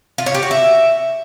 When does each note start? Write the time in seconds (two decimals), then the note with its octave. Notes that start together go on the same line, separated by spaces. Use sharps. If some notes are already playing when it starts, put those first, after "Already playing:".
0.18 F4
0.26 C#5
0.35 G4
0.43 F#4
0.51 E5